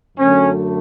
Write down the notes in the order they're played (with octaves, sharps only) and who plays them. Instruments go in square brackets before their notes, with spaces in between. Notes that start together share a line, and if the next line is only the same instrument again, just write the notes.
[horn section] F#2 D3 F#3 A3 C#4